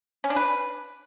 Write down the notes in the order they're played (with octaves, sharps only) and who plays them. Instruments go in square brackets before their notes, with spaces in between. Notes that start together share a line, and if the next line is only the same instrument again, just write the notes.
[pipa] C#4
D4
B4